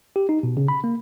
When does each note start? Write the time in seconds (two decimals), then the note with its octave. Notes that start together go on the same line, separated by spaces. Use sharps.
0.16 G4
0.29 D#4
0.43 B2
0.57 C#3
0.68 B5
0.84 A#3